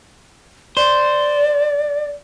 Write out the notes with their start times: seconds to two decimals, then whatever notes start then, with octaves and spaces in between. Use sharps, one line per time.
0.77 C5 D5